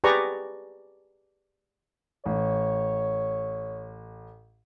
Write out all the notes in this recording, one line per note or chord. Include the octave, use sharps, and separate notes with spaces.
G4 G#4 B4 D5 A#5 C#6
A1 C#5